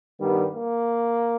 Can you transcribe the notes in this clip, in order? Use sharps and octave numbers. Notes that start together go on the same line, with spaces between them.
G2 D#3 G3 B3
A#3